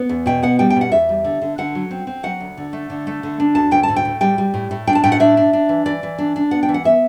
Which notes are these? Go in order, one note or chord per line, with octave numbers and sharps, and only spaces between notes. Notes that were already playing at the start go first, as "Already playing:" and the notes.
Already playing: B3
E2
B2 G5
B3 F#5
G3 G5
G5
B2 F#5
E2 E5
G3
D3
D3
D3 F#5
F#3
C4
C4
F#3 F#5
D2
D3
A3
D3
A3
D3
D4
D2 A5
D2 G5
A5
A2
G5
A2
G3 G5
G3
A2
A2
D4 G5
A5
A2 G5
F#5
D4 E5
D4
D4
E3
E3 D5
E3
D4
D4
B3 F#5
G5
E3
F#5
B3 E5